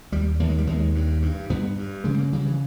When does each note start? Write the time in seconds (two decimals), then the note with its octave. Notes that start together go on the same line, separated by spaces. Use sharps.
0.12 D#2 G3
0.40 D#2 A#3
0.49 G#3
0.58 G3
0.67 D#2 G#3
0.95 G2
1.22 G2
1.50 G2 B3
1.77 G2
2.04 C#3 G#3
2.19 A#3
2.32 C#3 G3
2.46 E3